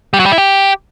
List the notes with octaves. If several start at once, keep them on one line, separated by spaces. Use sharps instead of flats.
G3
F#3
G3
E4
G4